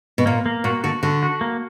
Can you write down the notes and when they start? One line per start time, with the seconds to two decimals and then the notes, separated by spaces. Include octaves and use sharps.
0.18 B2
0.26 A#2 A#3
0.46 A#3
0.64 A#2 F#4
0.84 D3 F#4
1.03 D3 F#4
1.23 F#4
1.41 A#3